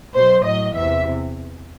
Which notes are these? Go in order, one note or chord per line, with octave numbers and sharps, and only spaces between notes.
B2 F#3 C5
A2 F#3 D#5
E2 C3 E3 E5